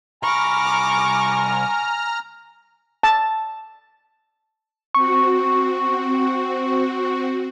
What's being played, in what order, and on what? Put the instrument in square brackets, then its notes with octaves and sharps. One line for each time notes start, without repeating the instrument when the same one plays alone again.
[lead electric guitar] C2 B5 [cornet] G#5 [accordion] A#5 F6 [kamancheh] C#6 D6
[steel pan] A5
[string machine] C4 F#4 [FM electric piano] C#6